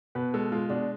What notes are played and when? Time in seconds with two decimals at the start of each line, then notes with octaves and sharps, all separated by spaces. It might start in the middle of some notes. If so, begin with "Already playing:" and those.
0.15 B2 B4
0.34 G#3 A4
0.52 G#3 F4
0.69 B2 D4